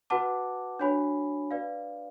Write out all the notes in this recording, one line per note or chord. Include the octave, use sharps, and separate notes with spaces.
F#4 B4 F#5 A5 D6
D4 F#4 C#5 G#5 B5
B4 D5 F5